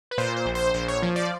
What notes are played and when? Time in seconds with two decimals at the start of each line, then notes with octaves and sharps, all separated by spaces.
0.11 B4
0.18 A#2 C5
0.36 C5
0.46 A#1
0.55 C5
0.74 A#1 C5
0.88 C#5
1.02 F3
1.16 D5